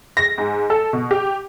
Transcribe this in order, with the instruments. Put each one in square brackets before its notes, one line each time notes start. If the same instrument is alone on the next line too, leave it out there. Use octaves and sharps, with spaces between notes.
[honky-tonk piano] A#6
G#2
A4
B2
G4